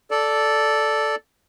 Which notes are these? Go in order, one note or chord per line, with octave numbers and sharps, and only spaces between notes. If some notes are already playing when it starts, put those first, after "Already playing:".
A4 D5